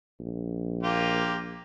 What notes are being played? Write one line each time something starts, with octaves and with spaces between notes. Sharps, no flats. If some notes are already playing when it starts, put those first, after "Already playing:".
A#1
A#3 F4 G4